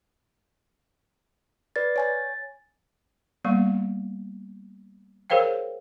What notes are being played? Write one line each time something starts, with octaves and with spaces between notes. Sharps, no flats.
B4 D5 A6
C#5 G#5 A6
G3 A#3 B3 C#6
G#4 A#4 C5 C#5 F5 G5